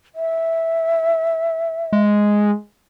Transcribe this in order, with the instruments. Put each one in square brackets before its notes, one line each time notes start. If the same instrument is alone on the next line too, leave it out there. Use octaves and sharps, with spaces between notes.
[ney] E5
[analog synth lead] G#3